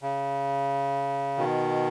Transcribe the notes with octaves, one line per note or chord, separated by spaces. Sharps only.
C#3
B2 D#3